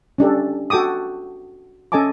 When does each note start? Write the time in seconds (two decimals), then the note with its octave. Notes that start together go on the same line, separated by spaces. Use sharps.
0.18 C#4 D4 G4 A4
0.70 F#4 A4 G5 D6 D#6
1.92 C#4 A4 D#5 G#5 A5 D6